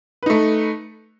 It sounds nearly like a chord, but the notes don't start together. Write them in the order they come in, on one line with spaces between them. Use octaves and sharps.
B4 D#4 A3